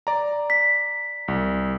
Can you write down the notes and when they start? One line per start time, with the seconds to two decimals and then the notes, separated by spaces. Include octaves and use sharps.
0.07 D5 A#5
0.50 B6
1.28 C2